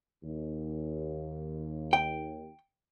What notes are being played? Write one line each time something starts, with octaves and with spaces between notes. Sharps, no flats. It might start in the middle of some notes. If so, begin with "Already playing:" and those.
D#2
G5